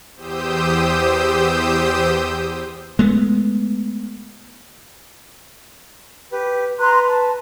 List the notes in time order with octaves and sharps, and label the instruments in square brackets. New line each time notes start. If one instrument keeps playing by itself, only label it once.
[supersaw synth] E2 G4 C5 D#6 E6 G6
[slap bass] G#3 A3 B3
[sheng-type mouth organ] G4 B4
[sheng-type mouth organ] B4 [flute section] A#5 C6 F#6
[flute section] A5